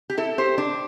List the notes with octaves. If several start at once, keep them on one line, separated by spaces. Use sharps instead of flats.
G4
E4 A4
G4 C5
D4